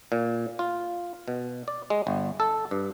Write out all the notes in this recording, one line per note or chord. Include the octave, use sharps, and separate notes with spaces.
A#2
F4
B2
D5
G#3
G1
A4
G2